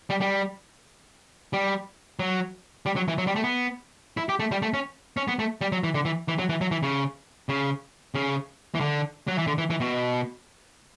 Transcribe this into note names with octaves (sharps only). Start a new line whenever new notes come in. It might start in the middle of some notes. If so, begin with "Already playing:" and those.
G3
G3
G3
F#3
G3
F#3
E3
F#3
G3
A3
B3
E4
G4
A3
G3
A3
C#4
C#4
B3
A3
G3
F#3
E3
D3
E3
E3
F#3
E3
F#3
E3
C#3
C#3
C#3
E3
D3
F#3
E3
D3
E3
E3
B2